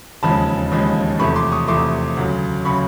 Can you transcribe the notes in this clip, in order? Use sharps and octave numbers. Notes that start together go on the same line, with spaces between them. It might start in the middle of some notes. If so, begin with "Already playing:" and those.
E1 D#2 C#3 F3 G#3 A5 B5
E1 D#2 C#3 F3 G#3
E2 C3 F3 A3 B5 C#6
C6 D6
C#6 D#6
E2 C3 F3 A3 C6 D6
D2 C#3 F#3
C#3 F#3 B5 C#6